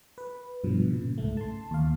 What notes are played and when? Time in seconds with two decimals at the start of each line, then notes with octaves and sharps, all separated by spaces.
0.18 B4
0.64 G2 B2 F3
0.90 A#2 C#3
1.18 C2 G#2 A3
1.37 A5 C6
1.71 D#2 F5